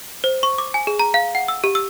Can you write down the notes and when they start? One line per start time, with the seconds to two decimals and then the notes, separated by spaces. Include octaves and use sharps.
0.24 C5
0.43 C#6
0.58 D6
0.74 G#5
0.87 G#4
0.99 A#5
1.14 F5
1.35 F#5
1.48 E6
1.64 G4
1.75 E6